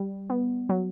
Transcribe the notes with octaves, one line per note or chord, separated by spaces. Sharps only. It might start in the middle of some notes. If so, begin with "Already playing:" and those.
Already playing: G3
B3
F#3